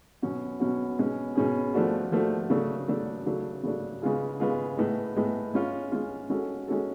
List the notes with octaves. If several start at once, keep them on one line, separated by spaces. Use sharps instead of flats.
B2 F#3 C#4 F#4
B2 F#3 C#4 F#4
B2 G#3 C#4 G#4
B2 G#3 C#4 G#4
F3 A3 D4 F#4
F3 A3 D4 F#4
C#3 F#3 A3 D4
C#3 F#3 A3 D4
C#3 F#3 A3 D4
C#3 F#3 A3 D4
C#3 G#3 B3 F4 G#4
C#3 G#3 B3 F4 G#4
A2 G#3 B3
A2 G#3 B3
G#3 C#4 F4
G#3 C#4 F4
G#3 C#4 F#4 A4
G#3 C#4 F#4 A4